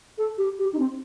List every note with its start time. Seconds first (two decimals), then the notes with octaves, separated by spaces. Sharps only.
0.18 A4
0.38 G4
0.59 G4
0.73 D#4
0.79 C4